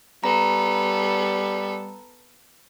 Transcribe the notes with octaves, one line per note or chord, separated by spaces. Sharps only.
G3 B3 A4 A#5